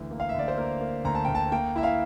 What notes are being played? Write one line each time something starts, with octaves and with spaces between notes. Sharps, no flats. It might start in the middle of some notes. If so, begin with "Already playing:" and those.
Already playing: D2 E3
A#3
F5
E5
D2 D5
C5
A#3 A#4
A#3
D2 A#5
A5
D2 G5
A5
A#3 G5
E4 E5
F5